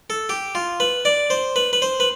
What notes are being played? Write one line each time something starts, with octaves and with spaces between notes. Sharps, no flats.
A4
G4
F4
B4
D5
C5
B4
B4
C5
B4